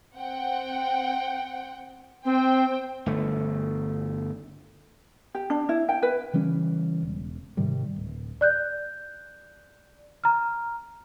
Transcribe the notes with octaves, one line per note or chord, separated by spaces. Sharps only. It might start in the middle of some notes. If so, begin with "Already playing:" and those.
C4 F#5 G5
C4 C5 G5
G1 A3
G4
D4
E4
G5
B4
C#3 E3 G3 C#4
E1
G#2 C3 D#3 G3
D1
D5 F#6 G6
A#5 F6